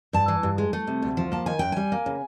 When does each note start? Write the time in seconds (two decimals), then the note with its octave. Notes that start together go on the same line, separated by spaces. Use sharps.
0.13 G2 A5
0.28 E3
0.43 G2
0.58 G#3
0.73 A3
0.87 C3
1.02 D2
1.17 F3
1.32 A#3 A5
1.46 D#3 G#5
1.59 F#2 G5
1.72 G3 G#5
1.92 A#3
2.06 C#3